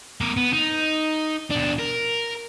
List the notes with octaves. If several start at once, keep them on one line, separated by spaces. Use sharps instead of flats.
B3 A#4
B3
D#4
B2 D4
A#4